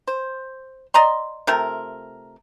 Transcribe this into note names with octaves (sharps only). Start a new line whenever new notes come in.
C5
D5 D#5 A#5 C6
C3 A3 F4 A#4